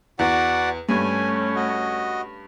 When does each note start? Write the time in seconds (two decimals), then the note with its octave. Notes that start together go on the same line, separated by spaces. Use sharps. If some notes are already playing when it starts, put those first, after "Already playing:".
0.19 E2 F#4 D5 F#5
0.89 G2 A3 C#4 G#5
1.56 F#4 D#5